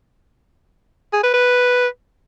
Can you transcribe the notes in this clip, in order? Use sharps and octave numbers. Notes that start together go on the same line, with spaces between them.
G#4
B4
B4